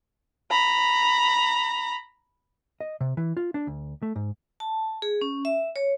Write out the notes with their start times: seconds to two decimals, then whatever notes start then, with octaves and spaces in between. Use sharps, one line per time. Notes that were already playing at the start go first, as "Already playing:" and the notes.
0.51 A#5 B5
2.81 D#5
3.01 C3
3.17 E3
3.37 F4
3.54 D4
3.67 D2
4.02 A3
4.16 G#2
4.60 A5
5.02 G#4
5.21 C#4
5.45 E5
5.76 C#5